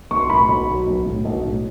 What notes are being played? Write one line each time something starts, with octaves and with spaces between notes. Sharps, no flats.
B1 C#6
C6
A2 B5 C#6
B1
F#3
B1
A2
B1
A2